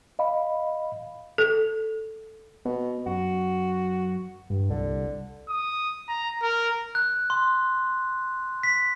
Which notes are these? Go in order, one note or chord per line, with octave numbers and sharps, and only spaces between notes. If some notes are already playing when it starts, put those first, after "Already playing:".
D#5 F5 B5
A4
B2 B3
F#2 F#4
G2
C2 D3
D#6
A#5
A#4
F#6
C6
B6